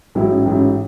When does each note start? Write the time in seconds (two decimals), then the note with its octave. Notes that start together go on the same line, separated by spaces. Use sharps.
0.15 A1 G#2 F#3 C#4 E4
0.46 A1 G#2 F#3 C#4 E4